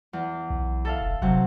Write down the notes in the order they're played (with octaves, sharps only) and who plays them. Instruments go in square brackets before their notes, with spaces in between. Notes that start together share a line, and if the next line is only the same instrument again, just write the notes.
[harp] E2
[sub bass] B1
[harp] A4 E5 F5
[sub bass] F1
[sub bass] G1 [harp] C3 F#3 F#4